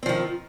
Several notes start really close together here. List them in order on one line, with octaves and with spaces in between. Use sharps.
C4 F3 D#3